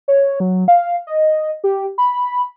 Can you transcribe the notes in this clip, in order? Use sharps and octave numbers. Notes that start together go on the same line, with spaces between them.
C#5
F#3
F5
D#5
G4
B5